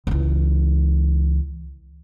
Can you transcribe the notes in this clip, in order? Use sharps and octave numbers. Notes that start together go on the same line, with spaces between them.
C#2 E3